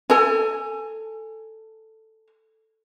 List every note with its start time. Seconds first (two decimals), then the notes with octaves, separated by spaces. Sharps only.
0.10 A4 G#5